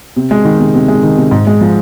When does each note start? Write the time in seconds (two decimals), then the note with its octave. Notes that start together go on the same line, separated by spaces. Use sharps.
0.16 C3
0.31 G#3
0.45 D#3
0.60 C3
0.74 C3
0.88 G#3
1.03 D#3
1.18 C3
1.31 G#2
1.47 G#3
1.61 F3